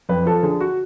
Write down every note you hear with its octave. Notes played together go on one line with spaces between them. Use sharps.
F2 B4
F3 A4
D3 G#4
F#4